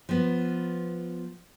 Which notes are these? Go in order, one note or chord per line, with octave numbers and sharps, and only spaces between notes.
F3 B3